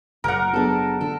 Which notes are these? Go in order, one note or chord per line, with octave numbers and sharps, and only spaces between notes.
F#1 A#2 A#4 F#5 A#5
F#3 B3 D4 G#4 A4
D3 A4